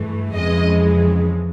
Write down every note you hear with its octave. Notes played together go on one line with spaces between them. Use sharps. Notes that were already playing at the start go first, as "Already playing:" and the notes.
Already playing: G2 E3 A3
F2 C#3 E3 G#3 D#5